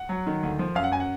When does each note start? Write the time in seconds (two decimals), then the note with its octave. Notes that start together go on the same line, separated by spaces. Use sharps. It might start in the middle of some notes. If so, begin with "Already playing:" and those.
Already playing: F#5
0.09 F#3
0.27 D#3
0.43 D2
0.59 F3
0.75 F#2 F5
0.84 F#5
0.92 F#2 G#5
1.00 F#5